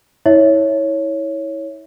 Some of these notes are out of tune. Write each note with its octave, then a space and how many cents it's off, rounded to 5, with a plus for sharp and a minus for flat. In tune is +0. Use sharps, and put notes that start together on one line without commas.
E4 -30 C#5 +0 E5 -10